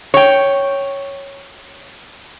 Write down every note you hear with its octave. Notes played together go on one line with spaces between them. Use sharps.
C#5 G5